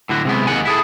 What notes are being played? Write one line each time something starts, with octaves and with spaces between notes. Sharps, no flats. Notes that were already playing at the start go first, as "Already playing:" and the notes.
A2 D3 F#4
C3 G#3 B3
D#2 D#3 F#5 G#5
E4 G#4 A4